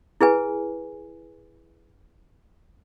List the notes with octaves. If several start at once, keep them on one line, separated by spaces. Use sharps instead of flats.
E4 G#4 B4 G#5